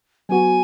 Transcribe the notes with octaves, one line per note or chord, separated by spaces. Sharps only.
F#3 B3 F#4 G#5